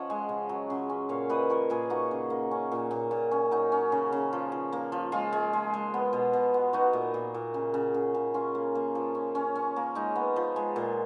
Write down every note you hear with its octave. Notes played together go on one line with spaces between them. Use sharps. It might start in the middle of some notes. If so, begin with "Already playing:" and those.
Already playing: F3 C#4 C#5 D#5 F#5
G#3
C#3
F#3
C#3
C#4
A#2 C#5 F5
A#2 B4 D#5
F3 A#4 C#5
A#2 G#4 B4
A#3 D#4 F#4
C#3
A#3
C#4
A#2
A#2
A#2
C#4
F#3 D#4
C#4
C#3
C#3
F3
F3
A#3
F3
G#3 F4
G#3
G#3
G#3
B3
B2
B2
B3
B3 D#4 F#4
A#2
A#2
A#2
C#3
C#3
C#3
C#3
C#4 F4
A#3
A#3
F3
C#4
C#4
C#4
A#3
G#3 D#4
B3
F3
G#3
A#2